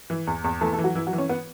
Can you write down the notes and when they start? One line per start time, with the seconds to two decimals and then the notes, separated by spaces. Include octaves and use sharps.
0.10 E3
0.27 E2
0.44 E2
0.61 E3 A3 A4
0.73 A3 A4
0.79 E3
0.84 F#3 F#4
0.95 E3 E4
1.07 F#3 F#4
1.13 E3
1.18 C#4 C#5
1.29 B3 B4